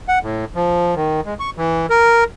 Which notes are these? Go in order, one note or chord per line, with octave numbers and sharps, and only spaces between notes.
F#5
A2
F3
D#3
G#3
C#6
E3
A#4